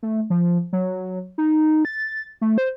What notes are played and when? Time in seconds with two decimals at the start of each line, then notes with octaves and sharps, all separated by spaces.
0.03 A3
0.30 F3
0.73 F#3
1.38 D#4
1.85 A6
2.41 A3
2.58 C5